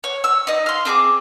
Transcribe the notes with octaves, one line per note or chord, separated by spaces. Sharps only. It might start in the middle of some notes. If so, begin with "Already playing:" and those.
C#5
E6
D#4 D#5
F5 C6
C4 G#4 A5 D6